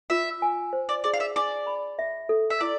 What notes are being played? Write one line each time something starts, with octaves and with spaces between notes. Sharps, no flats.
F4 E5
G#5
C5
D5
G#4 D5
F5
E5
D4 D5
B5
E5
A4
E5
E4 D5